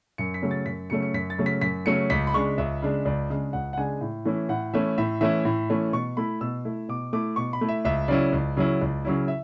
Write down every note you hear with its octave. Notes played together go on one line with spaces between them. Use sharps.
F#2 C#7
B6
C#3 F#3 A3 C#4
A6
F#2 B6
C#3 F#3 A3 C#4 C#7
C#7
F#2 B6
A6
C#3 F#3 A3 C#4
B6
F#2 B6
C#3 F#3 A3 C#4 C#7
C#2 B6
B5
C#3 G#3 D4 C#6
C#2 E5
C#3 G#3 D4
C#2 D5
C#3 G#3 D4
C#2 F#5
F#5
C#3 G#3 D4 G#5
A2
E3 A3 C#4 E4
A2 F#5
E3 A3 C#4 E4 E5
A2 E5
E3 A3 C#4 E4 E5
A2
E3 A3 C#4 E4
B2 C#6
A3 E4 B5
B2 E6
A3 E4
B2 D6
A3 E4 D6
B2 C#6
B5
A3 E4
E5
C#2 E5
C#3 F#3 C#4 E4 D5
C#2
C#3 F#3 C#4 E4
C#2
C#3 F#3 C#4 E4
E5